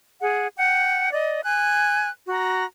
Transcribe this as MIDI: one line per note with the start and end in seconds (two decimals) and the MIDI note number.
0.20 0.47 68
0.20 0.47 78
0.57 1.12 78
0.57 1.12 79
1.13 1.40 74
1.13 1.40 75
1.44 2.10 80
1.44 2.10 90
2.28 2.64 66
2.28 2.64 82